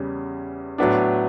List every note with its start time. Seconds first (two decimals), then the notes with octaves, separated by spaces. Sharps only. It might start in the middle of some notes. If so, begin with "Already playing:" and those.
Already playing: E2 C#3 G3
0.78 A2 F#3 B3 D4